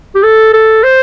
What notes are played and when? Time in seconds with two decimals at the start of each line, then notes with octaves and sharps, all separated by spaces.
0.15 G4
0.24 A4
0.54 A4
0.83 C5